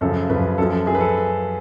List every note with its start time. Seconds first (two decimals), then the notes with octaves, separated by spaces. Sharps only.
0.01 F#2 C#3 F3 A4
0.30 F#2 C#3 F3 B4
0.58 F#2 F3 A4
0.72 A4
0.86 F#2 F3 G#4
0.95 B4
1.01 A4